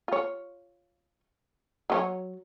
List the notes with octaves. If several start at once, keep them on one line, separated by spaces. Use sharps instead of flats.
F4 C#5
F#3 F4 C#5